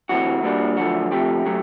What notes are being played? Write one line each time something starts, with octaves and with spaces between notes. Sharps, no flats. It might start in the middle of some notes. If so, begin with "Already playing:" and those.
D2 C3 E3 F#4
A#2 G3 A#3 D4
F#2 D3 F3 A3 F#4
D2 C3 F3 A3 G4
C#3 F#3 A3